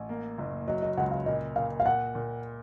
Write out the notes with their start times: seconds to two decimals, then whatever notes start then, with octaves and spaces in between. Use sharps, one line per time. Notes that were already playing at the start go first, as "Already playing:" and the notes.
Already playing: A1
0.09 A#3
0.38 F#1
0.68 F#3 D#5
0.82 D#5
0.97 C#2 F#5
1.11 F5
1.26 A#2 D#5
1.56 A#2 F5
1.80 F5
1.86 A#2 F#5
2.15 A#2